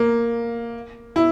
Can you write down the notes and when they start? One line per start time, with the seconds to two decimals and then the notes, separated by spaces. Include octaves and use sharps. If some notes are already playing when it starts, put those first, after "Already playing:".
Already playing: A#3
1.16 E4